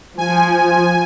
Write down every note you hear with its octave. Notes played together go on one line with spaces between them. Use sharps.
F3 G#5